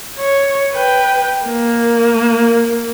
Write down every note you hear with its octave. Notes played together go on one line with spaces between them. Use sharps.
C#5
B4 G5
A#3